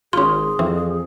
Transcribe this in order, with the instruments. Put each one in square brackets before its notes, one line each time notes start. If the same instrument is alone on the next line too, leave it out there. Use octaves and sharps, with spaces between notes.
[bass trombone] G#1 [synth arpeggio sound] C#4 F4 [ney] G#4 [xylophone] C6
[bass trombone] F2 [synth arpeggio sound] E3 C4